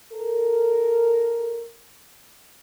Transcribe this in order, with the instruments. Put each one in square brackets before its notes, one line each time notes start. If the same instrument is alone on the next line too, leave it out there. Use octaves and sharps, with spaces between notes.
[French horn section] A4 A#4